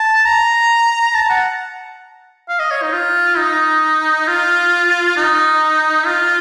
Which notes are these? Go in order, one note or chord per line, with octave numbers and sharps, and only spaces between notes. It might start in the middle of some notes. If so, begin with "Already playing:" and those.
Already playing: A5
A#5
A5
F#5
F5
D#5
C#5
D#4
F4
D#4
F4
D#4
F4